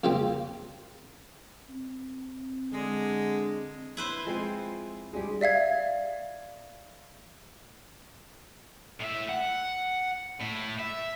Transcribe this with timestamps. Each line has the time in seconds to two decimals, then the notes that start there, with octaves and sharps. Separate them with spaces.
0.04 F2 C#3 F3 G3 A#3 C4
1.69 C4
2.72 D3 G#3
3.97 E4 B4 C5
4.25 F3 G#3 C4
5.13 G3 G#3 D4 G4 G#4
5.41 D5 E5 F5 G#6
9.00 A2 E5
9.29 F#5
10.40 A2 E4
10.79 E5